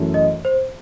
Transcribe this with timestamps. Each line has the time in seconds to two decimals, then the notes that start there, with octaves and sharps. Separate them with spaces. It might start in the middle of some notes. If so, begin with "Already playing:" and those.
Already playing: F#2 E3 A3
0.14 D#5
0.45 C5